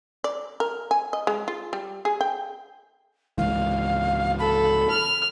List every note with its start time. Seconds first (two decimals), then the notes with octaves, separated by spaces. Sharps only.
0.24 D5
0.60 A#4
0.91 G#5
1.13 D#5
1.27 G#3
1.48 F4
1.73 G3
2.05 G#4
2.21 G5
3.38 C#2 G#2 E3 F5
4.39 A4 B5
4.90 F6